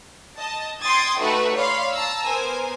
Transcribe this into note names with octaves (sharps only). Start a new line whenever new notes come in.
D#5 A5
G5 C6 D#6 G#6 A6
A3 D#4 F#4 B4 F#5 C#6
C#5 D5 F5 B5 C6
A5 A#5 E6
B3 A#4 C5 G#5